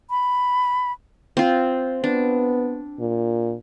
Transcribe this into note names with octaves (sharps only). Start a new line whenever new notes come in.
B5
C4 F4
B3 D4
A#2